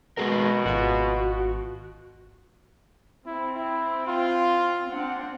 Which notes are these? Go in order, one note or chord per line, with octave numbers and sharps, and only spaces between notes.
B2 G#3 G#4 A#4
G#1 F4 F#4
C4 E4
E4
F4
C4 D4 F#5